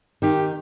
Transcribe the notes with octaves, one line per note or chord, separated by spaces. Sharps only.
D#3 D#4 G4